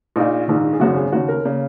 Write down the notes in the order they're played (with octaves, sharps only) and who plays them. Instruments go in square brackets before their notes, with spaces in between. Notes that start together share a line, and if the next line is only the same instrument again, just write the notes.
[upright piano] A#1 A#2 D#4
A#1 G#2 D#3
G#4
G#1 F#2 C#3 F#4
G#4
D#2 C#3 F#4
A#4
C#3 A#3